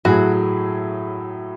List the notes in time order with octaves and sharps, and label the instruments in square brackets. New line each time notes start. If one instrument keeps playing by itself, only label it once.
[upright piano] A2 F#3 A3 E4 G#4 [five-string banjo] F#4